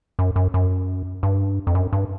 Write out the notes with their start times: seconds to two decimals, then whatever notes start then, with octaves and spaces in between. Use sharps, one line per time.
0.19 F#2
0.36 F#2
0.54 F#2
1.23 G2
1.67 F2
1.75 F#2
1.93 G2